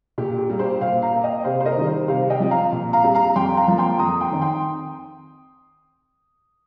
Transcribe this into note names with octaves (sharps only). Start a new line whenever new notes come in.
A#2 G4
G4
G3 A#3
G4 C5
A#2 C5 F5
F5 A#5
A#3
D#5 G5
C3 C5 F5
C5
A#4 D#5
D#3 G3
G4 C5
C3 C5 F5
D#5 G5
F3 C4
F5 A#5
A#2
F5 A#5
G3 C4
F5 A#5
F2 G5 C6
F5 A#5
F3 A#3
G5 C6
F2 A#5 D#6
G5 C6
D#3 C4
G5 C6